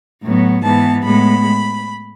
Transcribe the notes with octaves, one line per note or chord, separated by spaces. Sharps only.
A2 F#3 B3
G#2 E3 B3 A5
A2 G#3 B3 B5